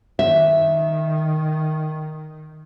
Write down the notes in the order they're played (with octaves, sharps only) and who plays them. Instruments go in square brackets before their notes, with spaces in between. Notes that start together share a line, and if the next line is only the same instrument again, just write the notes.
[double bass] D#3 [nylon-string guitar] E5